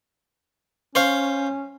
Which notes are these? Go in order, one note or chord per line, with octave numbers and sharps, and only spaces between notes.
C#4 C5 C#5 F5